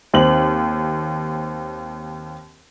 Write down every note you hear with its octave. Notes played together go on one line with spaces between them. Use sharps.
D#2 C4 F#7